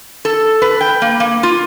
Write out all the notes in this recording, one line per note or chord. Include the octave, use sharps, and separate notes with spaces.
A4
B4
G5
A#3
A#3
F4